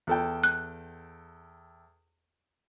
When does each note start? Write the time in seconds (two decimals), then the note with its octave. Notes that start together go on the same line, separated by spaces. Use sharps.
0.07 E2 A4 G5
0.44 F#6